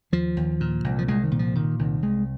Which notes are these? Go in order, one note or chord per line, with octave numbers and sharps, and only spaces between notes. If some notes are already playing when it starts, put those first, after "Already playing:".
D#2 F3
D#2
A#2
C2
F3
C2 G#3
D#3
A#2
F3
A#2 D#3
C2 D#3
C2 G#3